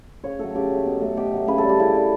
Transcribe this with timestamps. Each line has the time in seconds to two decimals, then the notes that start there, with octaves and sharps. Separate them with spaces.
0.24 C#3 C#5
0.39 F#3 A3 A4
0.55 C#3 G4
0.70 F#3 A3
0.86 B2
1.01 F#3 A3
1.17 B2 G4
1.33 F#3 A3
1.48 C#3 B4
1.58 A4
1.63 G3
1.69 G4
1.79 C#3 E4
1.94 G3